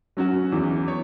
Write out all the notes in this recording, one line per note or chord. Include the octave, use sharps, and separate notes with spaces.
F#3 C#4 F#4
E2 E3 C#4
C#5